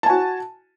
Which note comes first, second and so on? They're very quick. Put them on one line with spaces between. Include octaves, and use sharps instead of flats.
A5 G#5 F#4